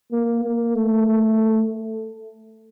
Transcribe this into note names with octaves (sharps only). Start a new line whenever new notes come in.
A#3
A#3
A3
A3